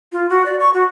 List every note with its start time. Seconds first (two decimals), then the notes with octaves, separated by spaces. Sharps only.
0.12 F4
0.30 F#4
0.46 D5
0.60 C#6
0.74 F#4